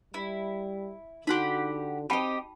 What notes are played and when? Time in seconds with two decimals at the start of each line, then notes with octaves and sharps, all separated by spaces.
0.14 G3 E4
1.27 D3 D#4 F#4 G4 F#5 B5
2.10 C4 G4 D#5 G5 A5 B5